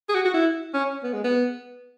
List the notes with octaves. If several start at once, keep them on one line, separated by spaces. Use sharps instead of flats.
G#4
F#4
F#4
E4
C#4
B3
G#3
B3